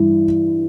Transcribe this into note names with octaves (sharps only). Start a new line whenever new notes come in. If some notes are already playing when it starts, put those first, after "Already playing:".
Already playing: G2 E3